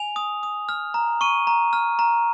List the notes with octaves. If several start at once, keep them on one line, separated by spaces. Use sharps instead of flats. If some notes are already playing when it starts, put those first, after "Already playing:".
Already playing: G#5 F7
D#6
D#6
F6
A#5
C#6 D#7
A#5
F6
A#5